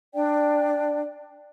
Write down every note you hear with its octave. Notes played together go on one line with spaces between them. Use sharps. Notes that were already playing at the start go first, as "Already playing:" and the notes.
D4 D5 G5